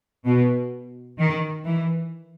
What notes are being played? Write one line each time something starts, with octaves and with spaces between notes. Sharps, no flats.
B2
D#3
E3